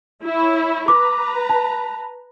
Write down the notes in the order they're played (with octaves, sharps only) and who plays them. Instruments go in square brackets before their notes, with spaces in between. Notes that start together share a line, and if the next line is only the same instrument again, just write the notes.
[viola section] E4 C#5
[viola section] B4 A#5 [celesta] D6
[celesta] A5